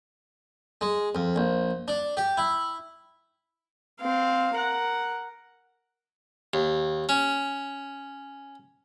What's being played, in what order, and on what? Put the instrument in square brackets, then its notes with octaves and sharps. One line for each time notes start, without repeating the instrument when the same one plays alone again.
[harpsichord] G#3
F2
A#1
D4
G4
E4
[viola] C4 F5
A#4 F#5
[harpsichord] D#2
C#4